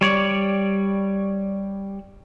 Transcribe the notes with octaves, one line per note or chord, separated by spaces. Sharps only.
G3 C#5 D5